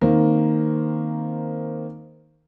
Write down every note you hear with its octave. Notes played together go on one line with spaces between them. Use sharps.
D#3 A#3 C4